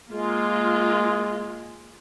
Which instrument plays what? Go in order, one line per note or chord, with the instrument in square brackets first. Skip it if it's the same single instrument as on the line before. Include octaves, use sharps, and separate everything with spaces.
[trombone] G#3 [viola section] A#3 F4